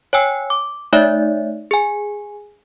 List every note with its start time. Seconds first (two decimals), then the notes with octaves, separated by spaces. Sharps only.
0.13 C#5 G5 G#5 E6
0.50 D6
0.93 A3 D#4 C#5 D5 E5
1.71 G#4 G#5